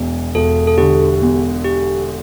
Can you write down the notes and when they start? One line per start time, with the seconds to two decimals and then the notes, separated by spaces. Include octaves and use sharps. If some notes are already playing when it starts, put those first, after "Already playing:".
Already playing: E1 E2
0.35 E1 A4
0.67 A4
0.77 D3 G4
1.22 E2
1.64 G4